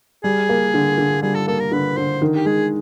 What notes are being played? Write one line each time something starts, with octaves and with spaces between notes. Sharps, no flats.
G3 G#4
A#3
D3
D3
G3 G#4
A4
A#3 A4
A#4
D3 B4
D3 C5
D#3
G4
G#3 G#4